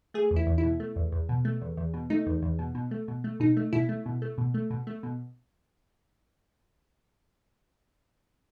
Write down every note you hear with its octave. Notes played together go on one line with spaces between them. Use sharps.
A3 G#4
E2
E4
E2
E4
B2
A3
E2
E2
B2
A3
E2
E2
B2
A3 D#4
E2
E2
B2
B2
A3
B2
A3
B2 D#4
A3
B2 E4
A3
B2
A3
B2
A3
B2
A3
B2